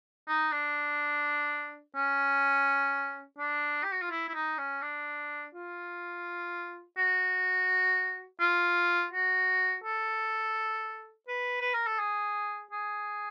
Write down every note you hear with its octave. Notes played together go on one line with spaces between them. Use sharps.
D#4
D4
C#4
D4
G4
F#4
F4
E4
E4
D#4
C#4
D4
F4
F#4
F4
F#4
A4
B4
B4
A#4
A4
G#4
G#4